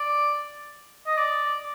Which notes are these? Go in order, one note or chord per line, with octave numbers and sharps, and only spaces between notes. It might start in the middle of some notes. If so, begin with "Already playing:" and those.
Already playing: D5
D#5
D5